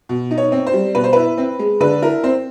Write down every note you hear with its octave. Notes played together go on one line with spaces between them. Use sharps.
B2
D#4
C#5
C4
C5
G3
B2 B4
C5
E4 B4
C4
G#3
D3 B4
E4 A#4
C4 C5